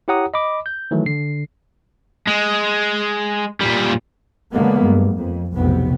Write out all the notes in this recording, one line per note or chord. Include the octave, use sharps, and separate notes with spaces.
E4 G4 C#5 F#5 A#5 D#6
D#5 B5 D6
G6
D#3 E3 F#3 A3
D3 C7
G#3
A#2 G3
D3 F#3 G#3 A#3 B3
G2
F2
F1 B1 A2 C3 B3